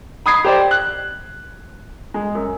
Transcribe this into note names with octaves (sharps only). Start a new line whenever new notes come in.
B5 D#6 G#6 C7
G4 C5 D5
F#6
G#3
F#2